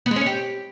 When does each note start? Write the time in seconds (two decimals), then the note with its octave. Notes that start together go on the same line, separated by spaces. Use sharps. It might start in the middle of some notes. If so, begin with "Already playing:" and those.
0.06 B3
0.11 G#3
0.16 C#4
0.21 C#5
0.26 G4